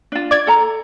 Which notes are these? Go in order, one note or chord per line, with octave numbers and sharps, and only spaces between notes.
D4 F4
D5 G#6
A4 A#5